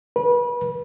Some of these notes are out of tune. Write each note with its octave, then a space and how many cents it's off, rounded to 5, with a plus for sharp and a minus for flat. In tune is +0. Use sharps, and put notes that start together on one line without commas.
B4 -30